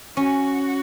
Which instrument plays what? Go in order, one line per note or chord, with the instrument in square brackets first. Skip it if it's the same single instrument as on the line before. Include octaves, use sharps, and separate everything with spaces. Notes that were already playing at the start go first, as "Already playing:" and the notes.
[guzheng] C#4 [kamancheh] F#4